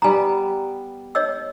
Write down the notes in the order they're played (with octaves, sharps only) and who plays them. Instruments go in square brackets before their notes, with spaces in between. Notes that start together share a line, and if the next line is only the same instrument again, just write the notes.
[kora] G3 B3 [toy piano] G#5 A#5
[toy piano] C#5 D#5 E6